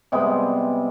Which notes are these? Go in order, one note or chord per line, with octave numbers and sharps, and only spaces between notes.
C3 G3 G#3 B3